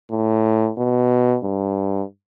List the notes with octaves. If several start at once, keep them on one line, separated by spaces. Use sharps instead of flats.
A2
B2
G2